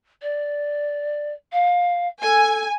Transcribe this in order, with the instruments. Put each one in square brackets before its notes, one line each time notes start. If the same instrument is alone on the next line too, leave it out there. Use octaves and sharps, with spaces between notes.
[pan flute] D5
F5
[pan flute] A4 [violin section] G#5